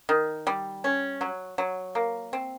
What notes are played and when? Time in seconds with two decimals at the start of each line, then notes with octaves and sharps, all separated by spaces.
0.09 D#3
0.47 G3
0.84 C#4
1.21 F#3
1.58 F#3
1.95 A#3
2.33 C4